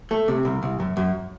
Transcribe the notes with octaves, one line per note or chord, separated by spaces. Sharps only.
A3
C3
C2
C2
F#2
F#2